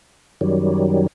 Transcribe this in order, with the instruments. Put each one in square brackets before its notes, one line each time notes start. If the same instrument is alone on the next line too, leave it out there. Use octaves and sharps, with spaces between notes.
[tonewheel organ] F#2 D#3 F#3 G3